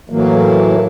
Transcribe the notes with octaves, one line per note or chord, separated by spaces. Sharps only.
A2 E3 F#3 A#3